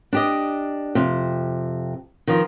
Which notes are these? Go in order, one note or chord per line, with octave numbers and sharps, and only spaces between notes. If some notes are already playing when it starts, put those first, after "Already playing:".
D4 G4 D#5
F2 C3 C5
D#3 F3